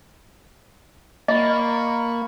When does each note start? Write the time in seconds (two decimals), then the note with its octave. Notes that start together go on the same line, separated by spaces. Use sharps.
1.28 A#3 D#5 B5 C#6